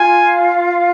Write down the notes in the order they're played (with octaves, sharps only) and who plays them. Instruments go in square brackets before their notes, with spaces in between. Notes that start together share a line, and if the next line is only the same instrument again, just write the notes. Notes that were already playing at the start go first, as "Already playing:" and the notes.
Already playing: [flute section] F4 F5 [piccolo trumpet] G#5